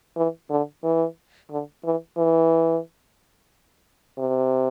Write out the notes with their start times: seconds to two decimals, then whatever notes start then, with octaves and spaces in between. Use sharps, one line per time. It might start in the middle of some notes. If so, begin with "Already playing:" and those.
0.17 E3
0.50 D3
0.84 E3
1.50 D3
1.84 E3
2.17 E3
4.18 C3